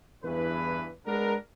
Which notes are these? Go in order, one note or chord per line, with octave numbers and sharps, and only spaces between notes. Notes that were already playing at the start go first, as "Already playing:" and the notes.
E2 G2 E3 B4
G#3 B3 D4 A#4